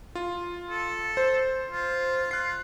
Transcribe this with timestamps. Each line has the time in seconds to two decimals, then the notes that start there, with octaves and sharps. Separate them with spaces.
0.15 F4
0.70 A4
1.17 C5
1.71 F4
2.31 F4 F#6 C7